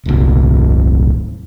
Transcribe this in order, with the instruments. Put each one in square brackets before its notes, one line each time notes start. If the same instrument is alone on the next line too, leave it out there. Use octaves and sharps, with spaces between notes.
[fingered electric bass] D#1 C2